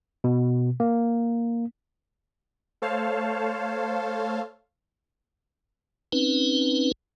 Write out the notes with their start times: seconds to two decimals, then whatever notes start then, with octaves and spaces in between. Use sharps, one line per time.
0.24 B2
0.80 A#3
2.82 A3 A4 C5 C#5 F5 A5
6.12 C4 C#4 D#4 B4